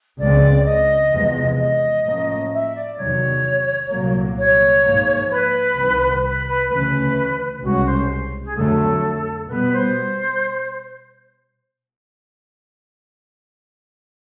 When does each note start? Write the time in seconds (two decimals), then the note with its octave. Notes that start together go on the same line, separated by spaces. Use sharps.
0.19 C#2 C#3 F3 G#3 C4 D5
0.65 D#5
1.11 E2 C3 F3 G#3 B3
1.58 D#5
2.05 A2 F3 A#3 C#4
2.52 E5
2.74 D5
2.97 E2 C3 D#3 F#3 C#5
3.90 C2 A#2 F#3 A#3
4.37 C#5
4.83 G#2 F3 A#3
5.30 B4
5.76 C2 C3 D#3
6.23 B4
6.46 B4
6.69 D2 C#3 E3 A3 C#4 B4
7.62 C2 B2 G#3 C#4 F#4
7.85 C5
8.44 G#4
8.55 F2 D3 F#3 A3 A4
9.48 B2 G3 B3 B4
9.72 C5